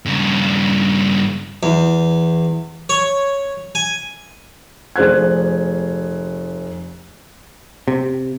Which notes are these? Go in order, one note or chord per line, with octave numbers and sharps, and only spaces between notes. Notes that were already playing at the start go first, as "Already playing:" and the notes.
G2 C#3
E2
C#5
G#5
F1 G#4 C5 F#6 G#6
C3